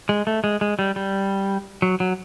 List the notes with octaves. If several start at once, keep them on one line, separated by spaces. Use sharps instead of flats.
G#3
A3
G#3
G#3
G3
G3
F#3
F#3